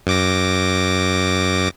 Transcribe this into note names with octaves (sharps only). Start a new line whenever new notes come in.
F#2 D6 A#6